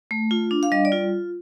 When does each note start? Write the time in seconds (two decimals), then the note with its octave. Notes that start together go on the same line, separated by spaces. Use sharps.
0.11 A3
0.31 F4
0.51 D4
0.63 F5
0.72 G3 D#5
0.85 D5
0.92 F4